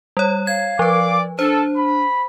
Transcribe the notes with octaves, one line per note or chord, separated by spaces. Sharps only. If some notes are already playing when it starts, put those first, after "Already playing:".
G3 C#5
F5 G#6
F3 B4 D5 D6
D4 A4 C5
B5